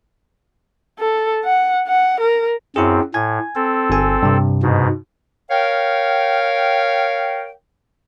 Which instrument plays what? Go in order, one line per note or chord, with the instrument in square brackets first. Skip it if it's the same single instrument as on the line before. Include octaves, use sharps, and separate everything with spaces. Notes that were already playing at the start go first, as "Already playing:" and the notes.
[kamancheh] A4
F#5
F#5
A#4
[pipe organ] F#2 C4 [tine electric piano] E4 G#4
[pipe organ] A2 [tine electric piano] G#5 G#6
[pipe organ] C4 A4
[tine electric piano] G1 G#5
G2 C3
[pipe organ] G#2 B2
[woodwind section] A#4 C#5 F5 G5